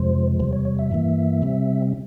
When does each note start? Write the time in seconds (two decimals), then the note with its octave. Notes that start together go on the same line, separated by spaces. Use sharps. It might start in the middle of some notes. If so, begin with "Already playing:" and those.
Already playing: F2 C3 F3 G#3 C5
0.40 E2 C3 G3 C5
0.53 C#5
0.65 C#5
0.79 E5
0.91 G2 E3 A#3
1.42 C3 G3 C4